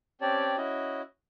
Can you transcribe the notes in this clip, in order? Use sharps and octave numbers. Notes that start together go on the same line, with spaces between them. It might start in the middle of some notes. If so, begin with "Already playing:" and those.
C4 C#4 G4 C#5 D5 A5
C#4 E4 F#4 D#5